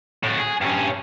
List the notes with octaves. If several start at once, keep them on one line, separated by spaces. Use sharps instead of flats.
A2 F#4
G#4
G2 C#4